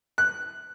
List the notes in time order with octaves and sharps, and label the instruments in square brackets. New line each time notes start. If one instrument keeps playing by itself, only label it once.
[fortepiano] F#6